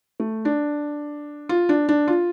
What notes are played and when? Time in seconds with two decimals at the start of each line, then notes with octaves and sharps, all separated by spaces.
0.20 A3
0.45 D4
1.49 F4
1.69 D4
1.89 D4
2.08 F4